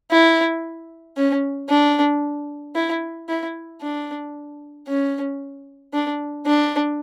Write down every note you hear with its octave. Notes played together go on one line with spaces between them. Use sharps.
E4
C#4
D4
E4
E4
D4
C#4
D4
D4